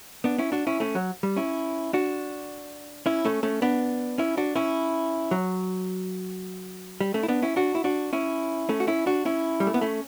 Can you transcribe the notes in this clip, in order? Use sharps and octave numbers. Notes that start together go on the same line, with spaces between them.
B3 D4
C#4 E4
D4 F#4
C#4 E4
A3 C#4
F#3
G3
C#4 E4
D4 F#4
C#4 E4
A3 C#4
A3 C#4
B3 D4
C#4 E4
D4 F#4
C#4 E4
F#3
G3
A3 C#4
E4
B3 D4
C#4 E4
D4 F#4
E4
D4 F#4
C#4 E4
A3 C#4
F#4
C#4 E4
D4 F#4
C#4 E4
G3
A3
B3
A3 C#4